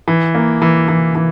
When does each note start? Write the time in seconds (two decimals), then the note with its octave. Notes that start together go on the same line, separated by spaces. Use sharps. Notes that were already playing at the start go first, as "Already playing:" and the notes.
0.08 E3
0.35 A#3
0.62 E3
0.88 E3
1.15 E3